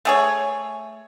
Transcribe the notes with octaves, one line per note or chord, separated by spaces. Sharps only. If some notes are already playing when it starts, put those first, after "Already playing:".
A3 G#4 C#5